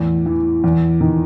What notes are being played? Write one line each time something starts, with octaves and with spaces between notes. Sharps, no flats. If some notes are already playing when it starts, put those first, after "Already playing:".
Already playing: E2 A2
E3
E2
D#3